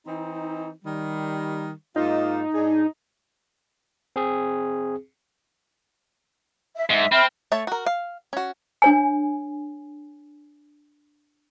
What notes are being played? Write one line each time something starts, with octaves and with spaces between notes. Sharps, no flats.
E3 C4 D#4
D#3 G3
G#2 A#3 D#4 F4
G#2 D4 G#4
C4 G#4
E5
G#2 E5
C4 E5 B5 F6
A3 C#5 E5 A5
F#4 A#4
F5
C#4 F#4
D4 C#5 G#5